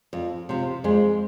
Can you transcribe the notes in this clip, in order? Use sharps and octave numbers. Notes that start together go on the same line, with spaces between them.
F2
C3 F3
F2 G#3